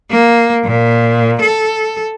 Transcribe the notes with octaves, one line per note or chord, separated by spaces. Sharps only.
A#3
A#2
A4